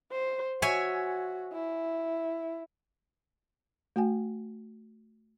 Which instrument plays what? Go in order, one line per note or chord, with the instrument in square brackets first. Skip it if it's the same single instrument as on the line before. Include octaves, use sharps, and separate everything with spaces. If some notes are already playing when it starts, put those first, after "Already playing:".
[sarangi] C5
[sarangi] F#4 [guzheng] C#5 E5 G#5
[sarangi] E4
[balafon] A3 F#4 G5 G#5